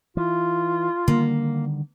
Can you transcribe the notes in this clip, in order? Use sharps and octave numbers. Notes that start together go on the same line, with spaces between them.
E3 F4
D3 D#3 G3 A#3